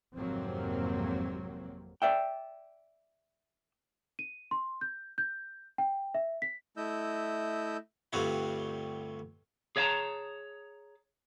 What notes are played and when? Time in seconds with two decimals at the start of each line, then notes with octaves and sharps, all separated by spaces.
0.16 G#1 F2 C3 F#3 A#3 C4
2.02 D5 E5 G5
4.19 D#7
4.51 C6
4.81 G6
5.18 G6
5.78 G5
6.15 E5
6.42 B6
6.77 A3 E4 D#5 E6 G6
8.13 D2 G2 G3 C4 F4 F#4
9.76 G#4 C#5 D#5 F5 A5 A#5